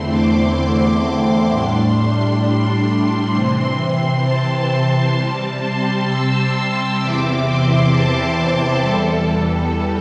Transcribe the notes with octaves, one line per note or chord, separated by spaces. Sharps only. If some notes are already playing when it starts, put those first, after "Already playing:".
Already playing: E2 D3 A3 C4 E4 C6
D6
D6
A2 G3 D4 C6
C3 E3 C4
A5
A5
A5
C3 G3 C4 A5
C6
E6
E6
E2 C3 E3 C4 E4 D6
C6
A5
E2 E3 G3 A4